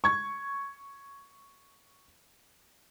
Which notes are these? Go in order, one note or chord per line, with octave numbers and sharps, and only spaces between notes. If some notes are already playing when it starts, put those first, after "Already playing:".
C#6 G#6